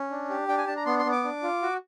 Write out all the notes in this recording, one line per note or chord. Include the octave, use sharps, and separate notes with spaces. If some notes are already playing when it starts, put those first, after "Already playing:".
Already playing: C#4
D4
G4
D4 G5
G#5
D4 A5
A#5
B3 C6
C6
B3
D6
D4
F4
F#4